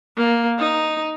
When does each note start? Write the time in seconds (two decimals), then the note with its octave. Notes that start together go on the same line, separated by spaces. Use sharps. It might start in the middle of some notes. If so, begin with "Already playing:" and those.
0.17 A#3
0.58 D#4